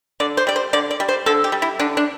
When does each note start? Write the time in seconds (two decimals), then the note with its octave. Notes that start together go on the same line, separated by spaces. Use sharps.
0.20 D3 D5
0.37 C5
0.47 G3 D5
0.56 C5
0.73 D3 D5
0.91 D5
1.00 G3
1.08 C5
1.26 D3 A4
1.44 G4
1.52 G3
1.62 E4
1.79 D3 D4
1.97 D4